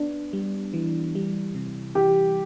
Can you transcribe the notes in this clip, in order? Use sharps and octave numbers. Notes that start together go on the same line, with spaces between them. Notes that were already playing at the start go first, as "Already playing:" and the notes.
Already playing: B3 D4
G3
E3
G3
C3
E3 G4